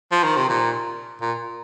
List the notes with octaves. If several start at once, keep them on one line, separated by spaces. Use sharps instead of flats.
F3
D#3
C3
A#2
A#2